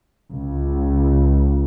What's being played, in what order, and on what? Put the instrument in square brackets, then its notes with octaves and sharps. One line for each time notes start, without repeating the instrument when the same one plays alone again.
[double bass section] C#2